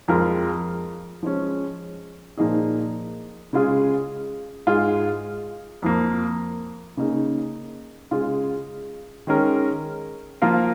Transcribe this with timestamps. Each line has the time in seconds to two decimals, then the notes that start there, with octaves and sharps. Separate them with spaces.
0.08 F2 F3 G#3 F4 A#4
1.23 F3 G#3 C#4
2.38 A#2 F3 A#3 D#4 G#4
3.53 C#3 G#3 F4 G#4
4.67 G#2 G#3 F4 G#4
5.82 F2 F3 A#3
6.97 C#3 A#3 D#4 G#4
8.11 C#3 G#3 F4 G#4
9.27 D#3 G#3 C#4 A#4
10.42 F3 A#3 F4 A#4